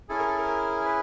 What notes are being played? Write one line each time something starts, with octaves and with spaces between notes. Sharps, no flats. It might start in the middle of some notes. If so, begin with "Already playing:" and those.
C#4 E4 G#4 A4
A#4
A4
A#4
B4